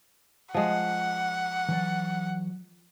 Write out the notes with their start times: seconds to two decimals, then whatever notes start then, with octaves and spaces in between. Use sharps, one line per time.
0.54 F3 G#3 F#5
1.68 E3 F#3 D5